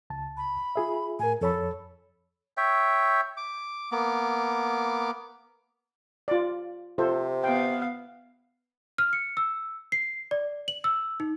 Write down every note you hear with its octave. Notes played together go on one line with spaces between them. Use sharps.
C#2 A5
B5
F4 G#4 E5
A2 A#4 G#5
F2 A4 C#5 B5
C#5 E5 G5
D6
A#3 B3 D6
F4 D5
C3 F4 A4 C5
B3 F5 G5
F6
C#7
E6
C7
D5
F#7
E6
D#4